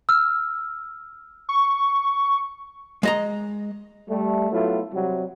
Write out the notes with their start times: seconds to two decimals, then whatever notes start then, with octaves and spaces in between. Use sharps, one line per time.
0.09 E6 F6
1.49 C#6
3.03 G#3 D#5 A#5
4.09 G3 A3
4.52 F#3 A3 B3 E4 F4
4.93 C3 F#3 G3